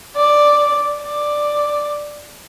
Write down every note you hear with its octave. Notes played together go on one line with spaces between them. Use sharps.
D5
D5